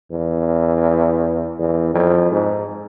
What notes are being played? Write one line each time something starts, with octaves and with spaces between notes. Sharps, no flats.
E2
E2
F2
G#2